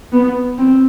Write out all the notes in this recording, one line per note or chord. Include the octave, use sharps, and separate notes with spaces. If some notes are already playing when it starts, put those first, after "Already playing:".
B3
C4